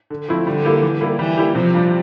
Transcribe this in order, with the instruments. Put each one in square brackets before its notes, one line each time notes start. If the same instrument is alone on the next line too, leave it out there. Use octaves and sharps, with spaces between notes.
[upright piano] D3
F3 A3 C4 E4
[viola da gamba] D3 [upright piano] G3
[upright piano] A#3 E4 G4
E3
G3 A#3 E4
[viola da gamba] E3 [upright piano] G3
[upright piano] A#3 E4 G4
[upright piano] C3 [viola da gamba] F3
[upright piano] G3 D4 F4